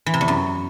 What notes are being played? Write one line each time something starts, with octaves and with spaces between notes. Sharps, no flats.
E3
C3
E2
F#2